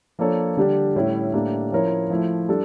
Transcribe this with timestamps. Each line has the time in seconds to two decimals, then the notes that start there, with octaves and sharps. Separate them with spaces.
0.19 F3 A#3 D4 A4 C#5
0.57 D3 G3 D4 G4
0.96 A2 G3 C#4 E4
1.33 A2 G3 A#3 D4
1.72 F3 C#4 E4 A#4 C#5
2.10 F3 A3 E4
2.49 G3 D4 A4